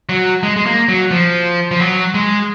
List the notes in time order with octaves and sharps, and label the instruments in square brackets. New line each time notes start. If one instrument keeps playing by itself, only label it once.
[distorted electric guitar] F#3
G#3
G#3
A#3
F#3
F3
F3
F#3
G#3